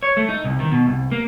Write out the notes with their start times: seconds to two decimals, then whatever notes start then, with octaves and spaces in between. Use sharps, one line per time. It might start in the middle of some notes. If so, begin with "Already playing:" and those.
0.03 C#5
0.17 A3
0.29 D#4
0.44 C2
0.60 D#3
0.72 B2
0.86 C2
1.11 A#3